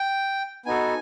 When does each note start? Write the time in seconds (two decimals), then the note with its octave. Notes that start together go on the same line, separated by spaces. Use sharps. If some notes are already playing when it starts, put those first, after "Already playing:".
Already playing: G5
0.66 B3 D#4 F#4 A4 G#5